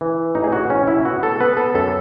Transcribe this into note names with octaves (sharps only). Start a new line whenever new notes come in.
E3
A1 D#4
G#4
F#4
A2 C#4
E4
B3 F#4
A4
B3 B4
A4
F#2 A4